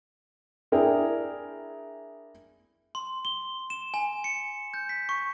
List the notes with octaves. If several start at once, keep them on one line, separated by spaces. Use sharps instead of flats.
D4 E4 G#4 A#4 G5
C6
G7
E7
G#5
C#7
G6
B6
C#6